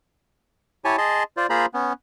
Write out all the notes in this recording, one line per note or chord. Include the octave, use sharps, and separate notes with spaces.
E4 G4 C#5 G#5 A5
G#4 D#5 A5 C6
F4 C5 D5
A#3 F4 G#4 C5 A#5 B5
B3 C#4